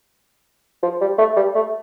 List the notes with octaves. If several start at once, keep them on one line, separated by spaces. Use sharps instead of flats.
F3
G3
A3
G3
A3